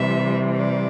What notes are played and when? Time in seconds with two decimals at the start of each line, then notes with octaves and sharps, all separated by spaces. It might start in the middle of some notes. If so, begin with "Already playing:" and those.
Already playing: C3 E3 G3 E5
0.55 D5